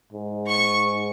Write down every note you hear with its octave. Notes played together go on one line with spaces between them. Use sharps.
G#2
C#6